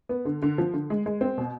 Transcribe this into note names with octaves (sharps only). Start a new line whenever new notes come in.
B3
D3
D3
F3
D3
G#3
G#3
C4
B2